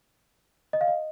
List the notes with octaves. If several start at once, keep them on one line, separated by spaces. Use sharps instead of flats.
D#5
F5
D#5